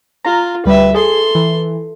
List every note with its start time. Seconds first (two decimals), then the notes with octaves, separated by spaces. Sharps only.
0.25 F4 A#5
0.66 D2 G3 B4 E5
0.95 G#4 A4 C6
1.35 E3